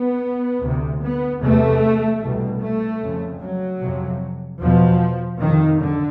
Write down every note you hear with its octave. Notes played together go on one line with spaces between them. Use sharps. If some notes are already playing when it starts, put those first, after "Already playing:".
Already playing: B3
D2 C3
B3
E2 C3 A3
C2 B2
A3
F2 C#3
F#3
F2 C3
E2 B2 F3
F2 C3 D#3
D3